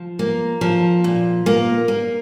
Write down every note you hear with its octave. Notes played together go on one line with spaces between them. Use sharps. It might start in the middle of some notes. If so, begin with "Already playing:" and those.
Already playing: F3
A#3
F3
A#2
A#3
A#3